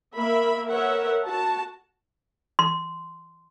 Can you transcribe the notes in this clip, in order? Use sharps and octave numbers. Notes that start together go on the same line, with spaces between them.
A#3 A#4 E5 B5
A#4 B4 C#5 E5 F#5
F#4 A5
C6